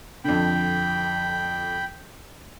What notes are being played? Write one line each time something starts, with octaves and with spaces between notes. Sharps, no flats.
F2 D3 G5 B5